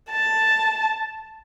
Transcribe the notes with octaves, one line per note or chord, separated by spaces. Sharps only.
A5